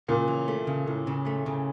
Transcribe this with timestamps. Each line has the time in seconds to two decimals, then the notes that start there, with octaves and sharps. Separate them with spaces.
0.08 A#2 C#3
0.28 E3
0.48 A3
0.67 C#3
0.86 A2 C#3
1.07 C#3
1.26 A3
1.46 C#3